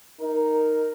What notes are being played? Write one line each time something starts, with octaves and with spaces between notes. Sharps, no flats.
D#4 A#4